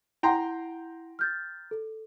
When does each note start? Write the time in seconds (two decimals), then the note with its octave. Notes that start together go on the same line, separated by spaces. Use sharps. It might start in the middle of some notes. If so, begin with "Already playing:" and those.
0.23 E4 F#5 G5 A#5 C6
1.19 F6 G6 A6
1.71 A4